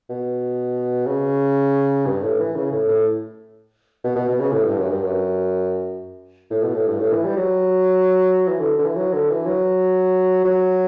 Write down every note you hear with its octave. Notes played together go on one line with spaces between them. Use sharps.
B2
C#3
G2
A2
E3
C#3
A2
A2
B2
B2
B2
C#3
A2
G2
F#2
G2
F#2
A2
B2
A2
G2
A2
E3
G3
F#3
E3
D3
D3
E3
F#3
D3
E3
F#3
F#3